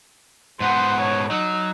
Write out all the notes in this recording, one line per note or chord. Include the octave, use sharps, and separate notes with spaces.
G#2 B3 C5 F#5
C#5
F#3 D#4